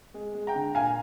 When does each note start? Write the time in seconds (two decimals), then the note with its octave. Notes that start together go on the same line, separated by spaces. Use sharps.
0.14 G#3
0.34 G#3
0.47 G5 A#5
0.55 D3
0.74 A#2 F5 G#5